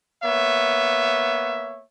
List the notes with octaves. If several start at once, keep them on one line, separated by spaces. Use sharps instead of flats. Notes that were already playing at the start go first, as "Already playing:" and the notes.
A#3 B3 C#5 E5